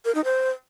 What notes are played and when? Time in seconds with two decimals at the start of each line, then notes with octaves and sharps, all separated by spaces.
0.05 A#4
0.15 D#4
0.24 C5